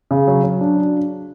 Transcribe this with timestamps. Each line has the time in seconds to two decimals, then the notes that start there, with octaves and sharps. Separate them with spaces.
0.11 C#3
0.27 F#3
0.44 F#3
0.61 D4